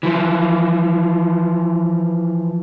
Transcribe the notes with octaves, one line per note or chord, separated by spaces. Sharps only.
E3 F3